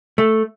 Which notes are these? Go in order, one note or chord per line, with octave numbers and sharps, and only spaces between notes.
A3